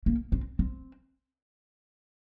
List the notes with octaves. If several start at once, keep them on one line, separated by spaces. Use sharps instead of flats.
A#3
C4
C4